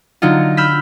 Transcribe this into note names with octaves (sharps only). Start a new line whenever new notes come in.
D3 F#3 D#4 F4
B5 E6 F6 G6 B6